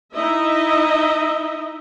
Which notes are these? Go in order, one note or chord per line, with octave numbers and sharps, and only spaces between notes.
D#4 E4 D#5 E5